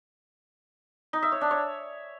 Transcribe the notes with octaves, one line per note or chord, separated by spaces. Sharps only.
D#4
E5
C#5
D4
C#5